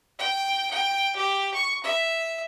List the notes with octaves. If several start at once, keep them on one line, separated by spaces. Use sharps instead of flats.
G5
G5
G4
C#6
E5